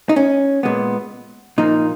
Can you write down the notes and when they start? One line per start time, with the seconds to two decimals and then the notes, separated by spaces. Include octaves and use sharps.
0.09 D#4
0.16 C#4
0.63 A#2 G#3 B3
1.58 A#2 F3 A#3 D#4